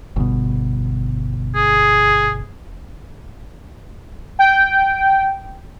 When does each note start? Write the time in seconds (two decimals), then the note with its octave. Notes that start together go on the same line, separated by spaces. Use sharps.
0.16 G1 B2
1.55 G#4
4.39 G5